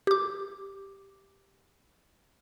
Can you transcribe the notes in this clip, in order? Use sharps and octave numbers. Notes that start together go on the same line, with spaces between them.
G4 D6